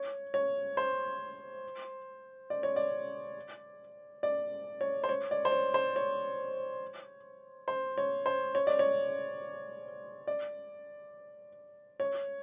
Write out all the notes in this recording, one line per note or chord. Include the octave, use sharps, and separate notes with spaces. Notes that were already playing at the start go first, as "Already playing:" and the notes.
Already playing: C#5
C#5
C5
D5
C#5
D5
D5
C#5
C5
C#5
D5
C5
C#5
C5
C#5
C5
C#5
C5
C#5
D5
C#5
D5
C#5